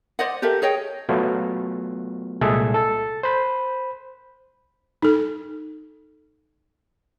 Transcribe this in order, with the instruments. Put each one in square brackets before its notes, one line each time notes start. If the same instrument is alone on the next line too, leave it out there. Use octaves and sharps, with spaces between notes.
[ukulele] C5 D5 D#5 F#5
G4 A4 A#4 E5
G#4 C#5 D#5 G5
[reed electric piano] F#3 A3 B3 F4 F#4
C2 A#2 G#3 G#4 A4 E5
A4 A6
C5 B5
[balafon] D#4 A4